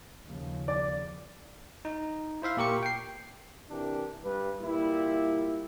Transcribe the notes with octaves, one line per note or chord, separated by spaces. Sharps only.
D#2 C#3 F3
D5
D#4
E4 C5 E5 F5
A#2 F4 G4 A#4 C#6 C#7
G5 C7
C3 E3 D4 G4 A#4
G2 B4
A#2 G3 E4